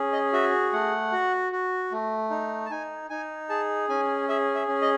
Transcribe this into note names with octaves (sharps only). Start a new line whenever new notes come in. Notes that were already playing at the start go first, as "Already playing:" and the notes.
Already playing: C#4 G#4
D#5
F#4 E5
A3 F#5
F#4
F#4
A3
D#4
A5
D#4 G#5
D#4 G#5
G#4 A5
C#4 G#5
G#4 E5
E5
C#4
D#5